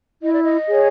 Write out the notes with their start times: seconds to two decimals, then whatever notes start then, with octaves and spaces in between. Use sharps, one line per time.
0.21 E4 D#5
0.32 D5
0.43 D#5
0.67 G#4 C#5